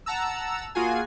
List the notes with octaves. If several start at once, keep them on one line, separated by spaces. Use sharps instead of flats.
F#5 A5 A#5 E6
A#3 F4 F#4 G#4 G#5